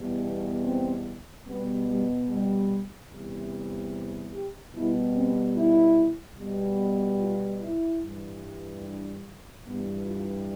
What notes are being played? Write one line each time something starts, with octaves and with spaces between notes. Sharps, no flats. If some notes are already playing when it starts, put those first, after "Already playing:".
Already playing: E2 B2 G3
C4
B2 G3 B3
G3
G3
E2 C3 G3
G4
B2 G3 E4
C4
E4
B2 G3
F4
E4
G2 E3 G3
D4
G2 E3 G3 B3
F4